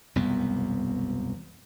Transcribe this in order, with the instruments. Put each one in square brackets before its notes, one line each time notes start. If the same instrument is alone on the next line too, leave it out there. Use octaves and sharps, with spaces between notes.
[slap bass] E1 C2 F#2 B3